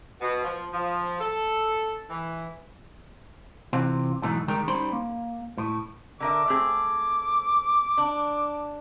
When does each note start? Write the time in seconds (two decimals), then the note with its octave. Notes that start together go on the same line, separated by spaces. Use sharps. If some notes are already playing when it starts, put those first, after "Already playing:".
0.21 B2
0.44 F3
0.73 F3
1.21 A4
2.10 E3
3.73 C3 E3 C4 F4
4.22 G#2 B2 E3 F#3 A3 D#4
4.48 D#3 G3 G#3 D#4 G4 A#4
4.68 G3 C#4 D#4 C5 B5 C6
4.92 A#3
5.58 A2
6.20 D3 A#4 E5 D6
6.48 A3 C4 G#4
7.98 D4